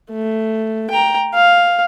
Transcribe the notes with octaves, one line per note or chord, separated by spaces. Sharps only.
A3
G5 A#5
F5